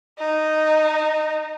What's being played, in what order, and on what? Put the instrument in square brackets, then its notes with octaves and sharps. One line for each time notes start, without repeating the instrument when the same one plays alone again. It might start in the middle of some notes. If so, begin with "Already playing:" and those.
[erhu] D#4